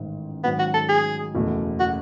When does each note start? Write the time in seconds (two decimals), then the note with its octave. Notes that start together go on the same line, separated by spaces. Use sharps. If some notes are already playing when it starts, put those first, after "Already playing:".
Already playing: A1 G#2 D#3
0.44 G#2 D#3 F#3 B3
0.59 F#4
0.74 A4
0.89 G#4
1.35 F#1 E2 B2 A3
1.80 F#4